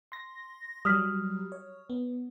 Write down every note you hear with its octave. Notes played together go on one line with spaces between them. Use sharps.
C6 A#6
F#3 G3 D#6 F6 B6
C#5
B3